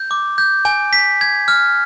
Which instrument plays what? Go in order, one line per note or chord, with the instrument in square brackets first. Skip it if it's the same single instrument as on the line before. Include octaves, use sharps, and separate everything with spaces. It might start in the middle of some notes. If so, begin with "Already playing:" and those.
Already playing: [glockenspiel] G6
D6
G6
G#5
B6
G#6
F6